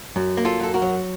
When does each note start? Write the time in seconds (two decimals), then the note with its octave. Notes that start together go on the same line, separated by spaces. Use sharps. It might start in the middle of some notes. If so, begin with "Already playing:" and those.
0.16 F#2
0.37 A#3
0.45 F4 A4
0.60 F#2 A4
0.74 F#4 A#4
0.82 F#3